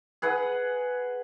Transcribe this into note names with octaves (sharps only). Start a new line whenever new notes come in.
G#4 B4 F#5